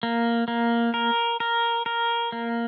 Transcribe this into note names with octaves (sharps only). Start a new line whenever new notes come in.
A#3
A#3
A#4
A#4
A#4
A#3